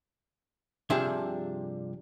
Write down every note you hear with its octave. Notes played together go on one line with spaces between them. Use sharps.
G2 C3 F3 D4 G#4 E5